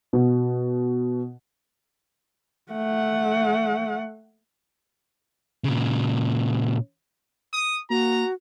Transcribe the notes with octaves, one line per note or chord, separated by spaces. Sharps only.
B2
A3 F#5
A#2 C#3
D#6
A#3 F#4 A#5